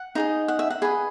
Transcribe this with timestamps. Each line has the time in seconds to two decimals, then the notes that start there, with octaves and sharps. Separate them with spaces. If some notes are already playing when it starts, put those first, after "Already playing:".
Already playing: F#5
0.15 D#4 G#4 D#5
0.48 F#5
0.59 E5
0.70 F#5
0.82 G#4 B4 D#5